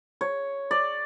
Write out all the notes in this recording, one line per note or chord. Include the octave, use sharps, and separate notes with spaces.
C#5
D5